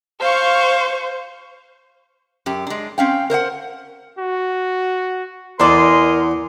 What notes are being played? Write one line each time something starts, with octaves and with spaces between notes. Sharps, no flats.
C5 F5 C#6
F#2 G4
G#3 D4
C4 C#4 F5 G5
A#4 C5 D#5 F#5
F#4
E2 A4 A#4 D5 D#5 G#5 C6